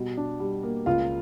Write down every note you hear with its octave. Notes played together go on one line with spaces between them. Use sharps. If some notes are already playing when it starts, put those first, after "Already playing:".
Already playing: B2 G3
D4
G3
A#3
C#2 F4 F5